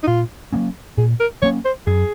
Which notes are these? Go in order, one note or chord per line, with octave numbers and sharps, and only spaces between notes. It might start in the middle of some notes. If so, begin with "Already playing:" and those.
D#4
A#2 F4
F#3 A#3 C#4
A#2 G#4
A#4
F#3 A#3 C#4 C#5
C5
F#2 G#4